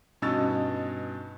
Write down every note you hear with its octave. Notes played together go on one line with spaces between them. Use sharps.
G2 B2 C#4 D#4 E6 A6